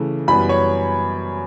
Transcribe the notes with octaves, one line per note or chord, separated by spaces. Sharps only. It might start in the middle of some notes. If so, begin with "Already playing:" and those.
Already playing: C#3 E3 A3
F#2 E3 G3 B3 B5
C#5